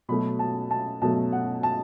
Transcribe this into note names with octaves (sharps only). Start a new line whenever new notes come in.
B2 F#3 A3 B5
A5
A5
B2 F#3 A3 A5
F#5
A5